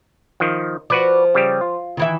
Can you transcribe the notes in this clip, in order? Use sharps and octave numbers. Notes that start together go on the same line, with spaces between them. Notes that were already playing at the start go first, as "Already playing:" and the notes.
D#3 F3
F3 F#4 B4 D5
C#3 G3 G4
F4
D#3 E3 E5